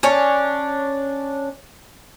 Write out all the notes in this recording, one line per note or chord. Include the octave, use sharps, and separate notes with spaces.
C#4 D4 C#5